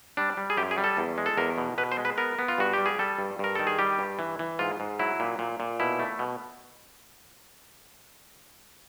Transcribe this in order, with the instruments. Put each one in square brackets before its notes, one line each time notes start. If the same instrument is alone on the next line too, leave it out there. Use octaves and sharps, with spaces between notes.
[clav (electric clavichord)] G3 D4
G3
G#4
F#2 G4
G#4
G3
A4
E2
G#3
A4
E2 A#4
B2
B2 B4
C5
G#3
B4
B3 A#4
B3
F4
G2 F#4
G3 G4
G#4
G3 A4
G2
G2 A#4
D#3 A4
G#4
G3 G4
G2
E3
E3
G#2 F4
G#2
F#3 E4
A#2
A#2
A#2
B2 E4
A3
B2